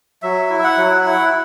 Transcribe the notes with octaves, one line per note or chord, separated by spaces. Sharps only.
F#3 E5
E4
E5
F#5
F#3
E4 F#5